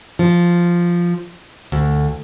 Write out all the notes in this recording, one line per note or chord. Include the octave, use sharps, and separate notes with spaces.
F3
D2